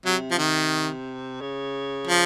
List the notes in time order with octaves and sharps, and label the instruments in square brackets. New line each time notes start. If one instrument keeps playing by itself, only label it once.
[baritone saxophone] C3 [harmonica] F#3
[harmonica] F3
D#3
[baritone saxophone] C#3
[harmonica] F3